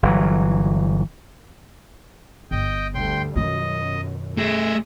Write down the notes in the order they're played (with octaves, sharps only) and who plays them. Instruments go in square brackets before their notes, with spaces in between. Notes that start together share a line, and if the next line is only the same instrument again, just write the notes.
[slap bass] G1 E3 F#3
[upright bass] G1 [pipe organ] D#5 G5
[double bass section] D2 D3 G3 [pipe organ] G5 C6
[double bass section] F#2 B2 [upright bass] D#3 F4 [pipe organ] D#5
[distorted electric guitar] A3 G#4 [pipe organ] E5 G#6 A#6